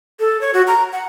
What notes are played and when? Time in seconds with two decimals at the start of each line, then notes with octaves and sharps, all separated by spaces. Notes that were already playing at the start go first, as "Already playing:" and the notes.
0.20 A4
0.41 C#5
0.54 F#4
0.67 A#5
0.92 F#5